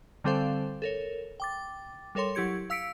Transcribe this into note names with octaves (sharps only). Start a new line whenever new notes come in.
D3 G3 C4 A4 C5 F5
A4 A#4 C#5
G5 D6 A6
G3 A4 A#4 C#5 C6
F#3 E4 G4 G#6 C#7
F5 E6 B6 C#7 D7